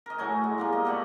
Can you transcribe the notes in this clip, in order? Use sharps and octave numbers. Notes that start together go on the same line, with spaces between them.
A#4 D#5
A2 F#3 A3 G#5
G#3
G3 A#3 B3
D#5
A#2 A3 B3 B5